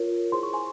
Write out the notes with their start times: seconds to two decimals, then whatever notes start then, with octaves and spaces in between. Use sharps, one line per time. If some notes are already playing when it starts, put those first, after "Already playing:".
Already playing: F4 A#4 C#5
0.32 E4 G#4 C5 C6
0.43 C#6
0.53 G#5 C6